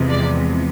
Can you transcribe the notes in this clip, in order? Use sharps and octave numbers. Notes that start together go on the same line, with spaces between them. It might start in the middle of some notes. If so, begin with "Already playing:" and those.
Already playing: E2 C3 F3 G#3
D5